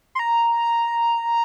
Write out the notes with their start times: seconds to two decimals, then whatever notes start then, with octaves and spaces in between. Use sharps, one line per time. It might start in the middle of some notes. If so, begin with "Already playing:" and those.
0.15 C6
0.19 A#5